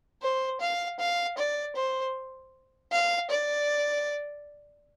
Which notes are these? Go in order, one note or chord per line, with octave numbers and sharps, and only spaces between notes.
C5
F5
F5
D5
C5
F5
D5